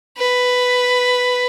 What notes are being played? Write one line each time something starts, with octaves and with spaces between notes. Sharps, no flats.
B4